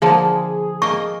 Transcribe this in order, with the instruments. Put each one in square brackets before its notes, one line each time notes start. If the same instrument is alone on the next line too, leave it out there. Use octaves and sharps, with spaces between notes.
[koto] D3 F3 A#3 [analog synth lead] G#4
[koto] A#3 D#5 [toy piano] C#6